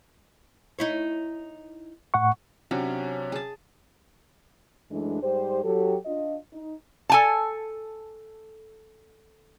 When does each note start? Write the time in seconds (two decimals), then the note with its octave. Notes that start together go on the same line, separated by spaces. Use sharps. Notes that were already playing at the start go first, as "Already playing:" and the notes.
0.79 D#4 E4 C#5
2.14 A2 F#5 C#6
2.71 C3 F#3 C#4 D4
3.32 G#4 A5
4.91 F#2 E3 G#3 A3 D4
5.22 G#2 G3 G4 C5
5.64 F#3 G4 A4
6.05 D4 F4 D#5
6.53 D#4
7.10 A4 G#5 A5